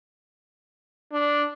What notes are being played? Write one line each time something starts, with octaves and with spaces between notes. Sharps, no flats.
D4